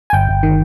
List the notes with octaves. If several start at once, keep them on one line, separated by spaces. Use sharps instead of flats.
G#5
G1 G5
G1
D#3